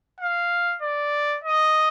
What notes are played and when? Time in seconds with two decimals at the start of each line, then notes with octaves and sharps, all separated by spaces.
0.20 F5
0.82 D5
1.44 D#5